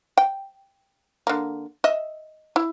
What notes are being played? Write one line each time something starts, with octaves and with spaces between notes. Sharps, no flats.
G5
D3 A#3
D#5 E5
E4